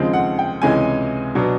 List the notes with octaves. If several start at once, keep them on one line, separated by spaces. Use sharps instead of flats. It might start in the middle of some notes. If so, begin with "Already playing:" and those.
Already playing: D#2 C#3 F3 G#3 C4
F#5
G5
C#2 C3 E3 G#3 C#4 G#5
B2 F#3 B3 D4